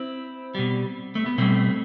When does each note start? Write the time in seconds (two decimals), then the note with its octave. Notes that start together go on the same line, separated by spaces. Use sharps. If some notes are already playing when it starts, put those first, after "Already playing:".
Already playing: C4 E4
0.55 B2 G3
1.15 A3
1.26 B3
1.38 B2 G3 A3 C4